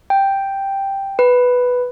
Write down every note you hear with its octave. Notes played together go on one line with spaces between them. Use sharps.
G5
B4